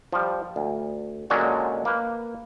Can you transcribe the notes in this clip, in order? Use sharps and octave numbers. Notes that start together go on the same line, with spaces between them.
F3 G3
D2
A#2 D3 F#3 G#3 C#4 D4
A#3 B4